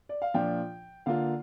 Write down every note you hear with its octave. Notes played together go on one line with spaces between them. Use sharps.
D5
F5
A#2 F3 D4 F4 G5
D3 A#3 F4 F5